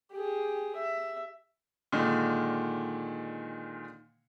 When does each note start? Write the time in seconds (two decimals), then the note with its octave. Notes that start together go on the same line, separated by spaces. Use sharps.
0.12 G4 G#4
0.76 E5
1.92 A#2 D3 D#3 G#3